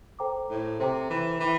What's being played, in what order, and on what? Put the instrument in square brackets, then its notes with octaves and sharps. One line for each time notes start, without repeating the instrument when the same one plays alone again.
[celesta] A4 C5 G5 A#5 D6
[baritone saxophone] A2
[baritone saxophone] C3 [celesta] A4 C5 G5 A#5 D6
[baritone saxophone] E3
[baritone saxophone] E3 [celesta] G5 D6